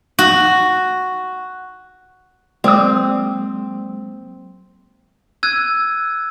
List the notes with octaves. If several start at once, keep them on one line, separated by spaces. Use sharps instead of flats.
F#4
F#3 G#3 A#3 C4 D5 D6 D#6
E6 F#6 G#6 D#7